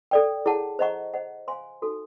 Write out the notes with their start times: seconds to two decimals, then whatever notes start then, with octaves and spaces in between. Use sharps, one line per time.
0.11 A4 D5 G5
0.46 E4 G#4 C#5 F#5 A5
0.79 C5 D#5 F#5 A#5 C#6
1.14 C5 D#5 F#5
1.48 C5 F5 G#5 C6
1.82 D#4 F#4 A4